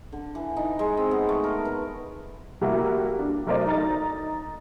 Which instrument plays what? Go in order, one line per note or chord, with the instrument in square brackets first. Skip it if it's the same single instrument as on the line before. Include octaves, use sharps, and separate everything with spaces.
[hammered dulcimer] D3
E3
D#4
G#3
C4
B3
A3
A#4
B4
[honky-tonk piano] G3 A3 A#3 E4 F#4
D4
F#3 A3 A#4 C5 D5 D#5
D#4 A#5 A6